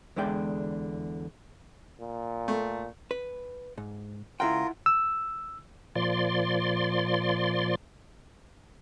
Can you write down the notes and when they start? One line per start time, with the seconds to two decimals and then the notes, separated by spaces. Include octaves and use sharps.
0.16 E2 D3 G#3 D5 G5
2.00 A#2
2.48 A3
3.11 B4
3.78 G#2
4.40 C#2 E4 F4 A#4 F#5 G5
4.86 E6
5.95 A#2 F3 D5 C6